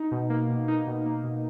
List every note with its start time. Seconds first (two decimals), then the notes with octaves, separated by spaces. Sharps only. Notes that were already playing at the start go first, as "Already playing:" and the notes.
Already playing: D#4
0.11 B2
0.30 A#3
0.49 B2
0.68 D#4
0.87 B2
1.06 A#3
1.24 B2